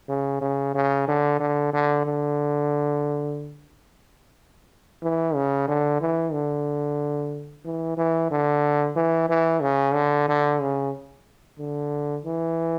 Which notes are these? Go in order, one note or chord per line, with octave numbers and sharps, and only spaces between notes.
C#3
C#3
C#3
D3
D3
D3
D3
E3
C#3
D3
E3
D3
E3
E3
D3
E3
E3
C#3
D3
D3
C#3
D3
E3